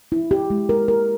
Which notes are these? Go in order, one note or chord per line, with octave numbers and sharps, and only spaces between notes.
E4
G4
G#3
A#4
A#4